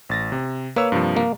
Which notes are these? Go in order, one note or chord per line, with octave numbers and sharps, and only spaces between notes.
A1 A6 A#6
C3
A#3 B4 C#5 E6
G2 C3 F3
A#3